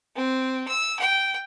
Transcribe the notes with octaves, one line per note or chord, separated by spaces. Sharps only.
C4
E6
G5